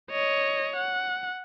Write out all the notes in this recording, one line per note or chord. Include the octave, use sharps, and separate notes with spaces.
C#5 D#5
F#5